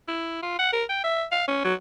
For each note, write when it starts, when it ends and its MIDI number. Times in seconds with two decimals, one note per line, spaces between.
0.08 0.37 64
0.43 0.55 65
0.59 0.71 78
0.73 0.84 70
0.90 1.03 79
1.04 1.25 76
1.32 1.43 77
1.48 1.63 61
1.65 1.74 54